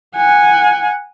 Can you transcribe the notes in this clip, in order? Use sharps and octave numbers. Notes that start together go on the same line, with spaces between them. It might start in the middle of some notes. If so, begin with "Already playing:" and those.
F#5 G#5